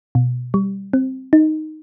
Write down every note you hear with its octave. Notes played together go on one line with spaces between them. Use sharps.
B2
G3
C4
D#4